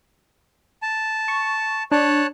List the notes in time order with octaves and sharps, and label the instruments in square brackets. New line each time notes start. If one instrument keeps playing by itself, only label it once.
[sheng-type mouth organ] A5
[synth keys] C#6
[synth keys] D4 [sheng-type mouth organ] C#5 A5 F#6